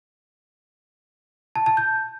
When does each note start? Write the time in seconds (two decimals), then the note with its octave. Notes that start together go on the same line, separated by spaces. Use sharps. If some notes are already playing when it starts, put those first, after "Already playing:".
1.56 A5
1.66 A5
1.77 G6